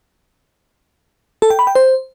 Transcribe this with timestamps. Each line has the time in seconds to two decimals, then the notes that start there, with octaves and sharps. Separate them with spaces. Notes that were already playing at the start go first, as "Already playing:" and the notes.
1.42 A4
1.50 G5
1.59 B5
1.67 G5
1.75 C5